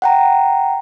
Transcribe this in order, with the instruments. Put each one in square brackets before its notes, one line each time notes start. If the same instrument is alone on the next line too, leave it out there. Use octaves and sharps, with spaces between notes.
[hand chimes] F#5 G5 A#5